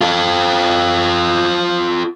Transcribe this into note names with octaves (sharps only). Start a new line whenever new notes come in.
F4 A4